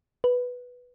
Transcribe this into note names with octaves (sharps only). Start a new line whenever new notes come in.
B4